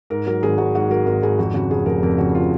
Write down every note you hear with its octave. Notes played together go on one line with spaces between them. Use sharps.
G#2 A#4
F#3 A#4
G#1 G#4
G#1 F#4
G#2 F#4
F#3 A#4
G#1 A#4
G#1 G#4
F2 F#4
C#3 F#4
F1 G#4
F1 A#4
F2 A#4
C#3 F#4
F4